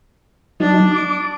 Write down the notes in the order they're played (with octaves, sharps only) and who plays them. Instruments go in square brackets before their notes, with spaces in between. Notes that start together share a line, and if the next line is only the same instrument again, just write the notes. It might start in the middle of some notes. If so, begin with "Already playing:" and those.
[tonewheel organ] F#3 D#4 [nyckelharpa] D4
[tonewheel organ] D6